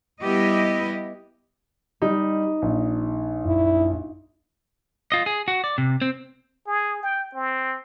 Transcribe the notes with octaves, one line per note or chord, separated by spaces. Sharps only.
G3 B3 E4 G4 D#5
G3 D#4
A#1
F#2 E4
F4 D#5
G#4
F#4
D5
C3
C4
G#4
G5
C4